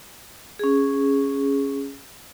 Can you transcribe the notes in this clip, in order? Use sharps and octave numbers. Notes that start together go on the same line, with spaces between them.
C#4 G#4